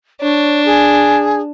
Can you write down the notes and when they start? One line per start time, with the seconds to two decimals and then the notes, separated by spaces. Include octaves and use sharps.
0.21 D4 C#5
0.66 G#4